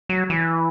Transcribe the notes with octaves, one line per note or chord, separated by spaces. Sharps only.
F#3
E3